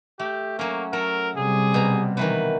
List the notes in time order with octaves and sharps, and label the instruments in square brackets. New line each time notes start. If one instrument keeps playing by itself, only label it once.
[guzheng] A3 [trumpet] G4
[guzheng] F#3 C#4 [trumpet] A#3
[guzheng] F#3 A4 [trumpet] A#4
[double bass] C3 G3 [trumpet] G#4
[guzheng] B2 A#5
[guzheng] D#3 E3 F#3 [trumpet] B4